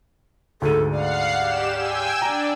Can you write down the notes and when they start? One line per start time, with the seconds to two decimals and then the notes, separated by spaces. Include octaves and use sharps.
0.62 D2 G#2 A4 D#7
0.92 D5 F5 F#5 C7
1.39 G4 E7
1.75 G5 G#5 E6
2.22 D4 D5 A#5